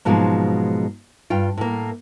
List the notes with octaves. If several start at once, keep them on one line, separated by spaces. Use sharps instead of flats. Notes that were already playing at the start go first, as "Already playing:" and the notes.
G#2 B2 F3 F#3 G#3 A#3
G2 F4 G5
A2 A#3